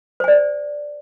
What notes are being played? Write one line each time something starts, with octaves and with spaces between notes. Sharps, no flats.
C5 D5 G#5